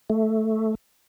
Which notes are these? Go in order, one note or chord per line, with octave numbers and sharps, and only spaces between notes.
A3